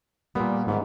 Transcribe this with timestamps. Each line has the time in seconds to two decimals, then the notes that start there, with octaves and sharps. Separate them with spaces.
0.35 A#2 G3 A#3 B3
0.68 G#2 D#3 G3 B3